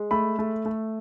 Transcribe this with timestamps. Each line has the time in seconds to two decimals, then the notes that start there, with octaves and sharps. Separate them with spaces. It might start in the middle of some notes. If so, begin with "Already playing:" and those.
Already playing: G#3
0.11 A3 B5
0.39 A3
0.65 A3